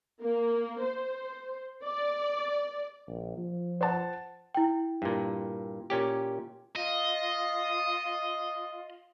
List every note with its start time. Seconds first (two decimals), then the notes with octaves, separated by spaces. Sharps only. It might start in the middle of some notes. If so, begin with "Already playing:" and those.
0.21 A#3
0.83 C5
1.84 D5
3.07 A#1
3.38 F3
3.81 C5 F#5 A5
4.55 E4 G5
5.02 G2 A#2
5.90 A#2 C#4 G4
6.76 F4 D#5